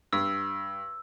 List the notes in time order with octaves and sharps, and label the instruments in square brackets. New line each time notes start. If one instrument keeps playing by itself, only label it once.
[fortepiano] G2 [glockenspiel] E6